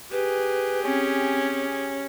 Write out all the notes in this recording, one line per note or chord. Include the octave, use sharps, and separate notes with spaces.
G4 G#4 B4
C4 C#4